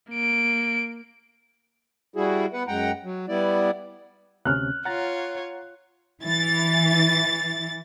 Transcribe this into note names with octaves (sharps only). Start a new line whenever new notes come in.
A#3 D7
G3 E4 F#4 G#4
B3 B4 F#5
F#2 G#3 F#5 G5 A#5
F#3
G3 B3 E4 D5
D2 C3 C#4 F6 F#6
F4 C#5 F#5 A#5 A6
E3 A6